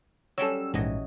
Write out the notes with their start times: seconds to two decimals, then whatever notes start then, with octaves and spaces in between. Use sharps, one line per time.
0.38 F#3 G3 C#4 A4 C#5 E6
0.74 A#1 G#2 E3 F#3 D#5